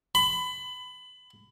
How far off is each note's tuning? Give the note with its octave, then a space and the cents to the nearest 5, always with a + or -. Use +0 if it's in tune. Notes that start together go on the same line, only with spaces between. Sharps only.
B5 +25